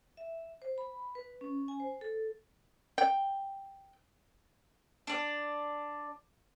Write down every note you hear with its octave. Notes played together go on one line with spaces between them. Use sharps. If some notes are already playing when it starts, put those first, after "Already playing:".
E5
C5
B5
B4
C#4
G#5
C5
A4
G5
D4 D5